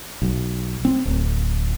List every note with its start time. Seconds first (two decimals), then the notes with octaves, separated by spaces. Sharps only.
0.22 B1
0.85 C4
1.05 D1